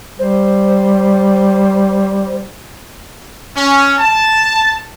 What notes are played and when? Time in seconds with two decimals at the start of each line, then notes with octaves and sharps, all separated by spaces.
0.19 G3 C5
3.56 C#4
3.99 A5